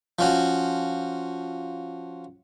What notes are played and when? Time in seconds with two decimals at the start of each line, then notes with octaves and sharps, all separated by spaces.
0.19 F3 C#4 F#4